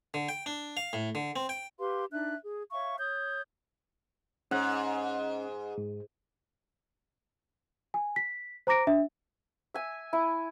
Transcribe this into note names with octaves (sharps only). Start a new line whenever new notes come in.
D3
G5
D4
F5
A2
D3
C4
G5
G4 B4 F5 C6
D4 D#4 E5 F#6
G#4
C#5 E5 F5 C#6
C#5 D#6 G6
G#2 C#4 F#5 F#6
G#2
G#5
B6
C5 A#5 D6 A#6 D7
D4 E5
E5 G#5
E4